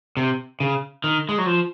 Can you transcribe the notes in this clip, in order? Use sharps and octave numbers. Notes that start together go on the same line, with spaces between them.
C3
C#3
D#3
G#3
F#3
F3